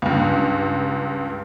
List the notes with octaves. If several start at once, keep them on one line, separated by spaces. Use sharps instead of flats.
C#2 G2